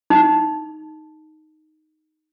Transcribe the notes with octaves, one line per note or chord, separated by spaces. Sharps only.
D#4